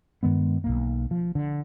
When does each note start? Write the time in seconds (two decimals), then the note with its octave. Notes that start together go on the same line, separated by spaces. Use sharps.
0.23 G2 D#3 G#3 B3
0.64 B1 F#2 A#3
1.11 F3
1.35 D3